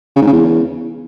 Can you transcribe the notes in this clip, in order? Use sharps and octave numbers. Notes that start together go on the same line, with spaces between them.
C#3
G#2
C#3
E2